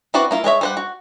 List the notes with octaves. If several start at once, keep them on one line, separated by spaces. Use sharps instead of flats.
C4 E4 F#4 B4 D5
A#3 E4 F4
G#3 G#4 C#5 E5
G3 C5 F#5
F#4